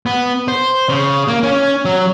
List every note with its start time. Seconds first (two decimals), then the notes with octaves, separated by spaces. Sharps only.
0.06 B3
0.48 C5
0.89 C#3
1.28 A#3
1.43 C#4
1.85 F#3